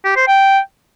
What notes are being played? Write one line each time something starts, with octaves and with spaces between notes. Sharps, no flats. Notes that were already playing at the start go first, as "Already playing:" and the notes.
G4
C5
G5